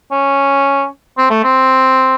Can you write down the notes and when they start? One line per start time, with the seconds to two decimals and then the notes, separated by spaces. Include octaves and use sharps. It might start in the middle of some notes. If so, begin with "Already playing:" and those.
0.11 C#4
1.17 C4
1.30 A3
1.44 C4